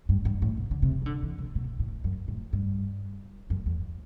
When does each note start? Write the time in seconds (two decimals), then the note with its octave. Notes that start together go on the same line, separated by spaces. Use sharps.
0.09 G2
0.25 G2
0.42 A2
0.57 B2
0.71 D3
0.82 C3
1.02 E3
1.06 D3
1.23 E3
1.38 C3
1.55 B2
1.79 A2
2.04 F#2
2.28 A2
2.53 G2
3.50 F#2
3.66 E2